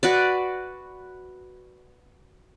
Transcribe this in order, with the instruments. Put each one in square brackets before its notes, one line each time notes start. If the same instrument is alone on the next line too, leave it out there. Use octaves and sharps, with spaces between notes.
[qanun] F#4 B4 D5